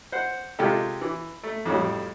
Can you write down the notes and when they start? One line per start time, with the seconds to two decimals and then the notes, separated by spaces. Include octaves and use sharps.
0.12 C5 F#5
0.59 C3 G#3 F4 G4 A4
1.01 E3
1.43 A3
1.65 F2 A2 F#3 G3